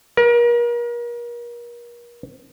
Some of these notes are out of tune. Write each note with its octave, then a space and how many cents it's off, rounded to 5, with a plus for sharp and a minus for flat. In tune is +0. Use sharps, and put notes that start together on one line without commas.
A#4 +35